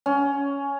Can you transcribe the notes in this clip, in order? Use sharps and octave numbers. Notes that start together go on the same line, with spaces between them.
C#4